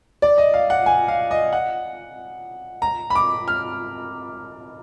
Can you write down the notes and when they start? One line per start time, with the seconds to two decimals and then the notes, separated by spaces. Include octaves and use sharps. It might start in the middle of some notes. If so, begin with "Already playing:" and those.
0.22 D5
0.38 D#5
0.54 F5
0.70 F#5
0.86 G#5
1.08 F5
1.31 D#5
1.53 F#5
2.82 A#5
3.10 B5
3.15 D6
3.48 F6